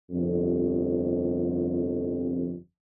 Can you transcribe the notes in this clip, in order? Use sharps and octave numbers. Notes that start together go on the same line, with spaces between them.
G1 C2 F2